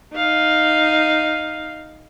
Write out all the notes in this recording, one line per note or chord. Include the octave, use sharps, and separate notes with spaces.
D#4 F5